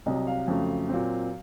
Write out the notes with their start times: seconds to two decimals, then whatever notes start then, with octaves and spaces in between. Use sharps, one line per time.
0.06 C2 C3 F#3 D#5
0.27 F5
0.48 F2 C#3 F#3 A3
0.89 A#2 F#3 C4